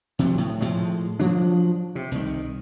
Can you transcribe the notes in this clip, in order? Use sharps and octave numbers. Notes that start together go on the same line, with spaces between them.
C3 F3 F#3
A2
A2 F3 G#3
F3 F#3 D4
C3
C2 D#3